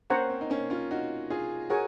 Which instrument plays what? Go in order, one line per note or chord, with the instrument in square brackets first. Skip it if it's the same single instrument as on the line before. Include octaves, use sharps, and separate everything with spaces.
[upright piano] A#3 C#4 [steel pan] C5 F#5 A#5 C#6
[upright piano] C4
D#4
A#3 C#4
C#4 F4
D#4 F#4
F4 G#4
[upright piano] F#4 A#4 [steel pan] G#4 C#5 G#5 C#6